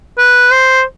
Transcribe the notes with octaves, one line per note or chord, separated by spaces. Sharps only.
B4
C5